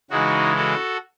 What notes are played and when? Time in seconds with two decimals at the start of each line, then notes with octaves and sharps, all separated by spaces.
0.11 C#3 E3 G#3 D#4 F#4
0.56 F#4 A4